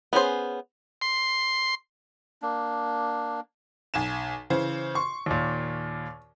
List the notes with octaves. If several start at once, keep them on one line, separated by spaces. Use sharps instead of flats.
B3 C#4 G#4 C5
C6
A#3 D4
B1 G#5 E7
C#3 E3 C5
C6 C#6
D#2 A#2